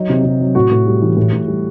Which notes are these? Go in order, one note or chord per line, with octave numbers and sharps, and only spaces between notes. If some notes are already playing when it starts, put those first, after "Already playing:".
Already playing: F#3 D#4
C3
C3
F#3
A2 F#4
A2
G3
E3
A2
A2
G3